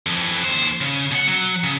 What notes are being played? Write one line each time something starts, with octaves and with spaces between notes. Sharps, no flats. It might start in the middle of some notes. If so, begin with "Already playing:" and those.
F2 E3
D#2 C5
C#3
B2 F#5
F#3
C#3